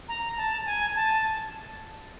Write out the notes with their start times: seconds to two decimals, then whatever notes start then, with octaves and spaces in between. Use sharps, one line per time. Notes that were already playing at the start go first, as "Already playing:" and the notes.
0.08 A#5
0.37 A5
0.66 G#5
0.96 A5